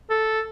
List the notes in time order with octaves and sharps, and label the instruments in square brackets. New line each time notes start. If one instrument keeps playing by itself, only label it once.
[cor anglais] A4